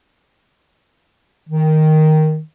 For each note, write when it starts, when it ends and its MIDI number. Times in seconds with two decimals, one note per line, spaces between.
1.49 2.40 51